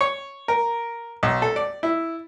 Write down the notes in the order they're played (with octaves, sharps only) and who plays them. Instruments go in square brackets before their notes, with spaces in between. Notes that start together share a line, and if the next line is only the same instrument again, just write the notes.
[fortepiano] C#5
A#4
B1
A4
D5
E4